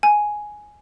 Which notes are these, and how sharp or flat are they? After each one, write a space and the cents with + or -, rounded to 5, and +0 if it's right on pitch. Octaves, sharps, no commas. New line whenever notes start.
G#5 +5